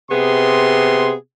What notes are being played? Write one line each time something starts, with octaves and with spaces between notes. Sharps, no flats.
C3 B3 G#4 C6